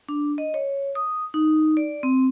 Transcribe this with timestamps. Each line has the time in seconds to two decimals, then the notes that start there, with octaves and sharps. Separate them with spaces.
0.09 D4
0.38 D#5
0.54 C#5
0.95 D#6
1.34 D#4
1.77 D5
2.03 C4